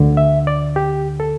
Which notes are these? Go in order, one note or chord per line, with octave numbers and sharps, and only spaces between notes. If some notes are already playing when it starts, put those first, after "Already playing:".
Already playing: D2 D3
E5
D5
G4
A4